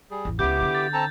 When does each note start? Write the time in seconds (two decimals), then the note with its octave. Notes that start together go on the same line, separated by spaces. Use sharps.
0.11 G3 G#4
0.25 A1 E2
0.39 C#2 C#3 B3 E4 G4 D6 G6
0.62 D3
0.75 A6
0.93 C4 A4 A5 A#5